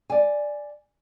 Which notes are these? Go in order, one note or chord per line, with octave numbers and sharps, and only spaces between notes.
D5 G#5